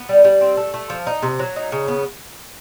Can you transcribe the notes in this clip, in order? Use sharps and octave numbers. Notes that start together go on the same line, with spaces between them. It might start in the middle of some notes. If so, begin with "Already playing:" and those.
Already playing: B3
G3
G3
C4
A3
A3
F3
D#4
C3
F#3
D#4
C#3
B3